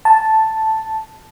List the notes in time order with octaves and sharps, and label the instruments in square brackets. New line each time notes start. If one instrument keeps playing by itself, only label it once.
[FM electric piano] A5